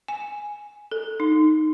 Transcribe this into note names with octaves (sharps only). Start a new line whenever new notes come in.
G#5
A4
D#4